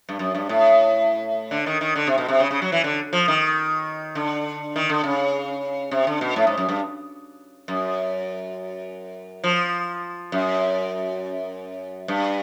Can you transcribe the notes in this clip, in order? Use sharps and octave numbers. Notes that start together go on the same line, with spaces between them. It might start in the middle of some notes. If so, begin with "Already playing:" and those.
G2
F#2
G2
A2
D3
D#3
D#3
D3
C3
B2
C3
C#3
C#3
F#3
E3
D3
F3
D#3
D3
D#3
D3
C#3
C3
D3
B2
A2
G#2
F#2
G2
F#2
F3
F#2
G2